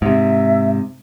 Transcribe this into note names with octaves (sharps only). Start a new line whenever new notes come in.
G#2 C3 E5